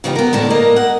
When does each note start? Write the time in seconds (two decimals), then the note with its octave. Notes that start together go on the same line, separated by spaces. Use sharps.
0.04 C#3 E3 B3 D#4 F4 G4
0.16 B3 A#4
0.33 A2 D3 A#4 A5
0.50 A#3 A#4 D#5
0.76 F#5